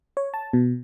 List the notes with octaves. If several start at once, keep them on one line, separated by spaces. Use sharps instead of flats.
C#5
A5
B2